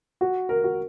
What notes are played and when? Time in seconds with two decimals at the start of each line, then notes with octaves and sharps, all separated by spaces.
0.21 F#4
0.49 A#4
0.64 F#4